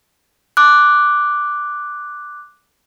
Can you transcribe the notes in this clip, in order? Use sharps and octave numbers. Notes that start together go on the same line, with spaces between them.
D6 F#6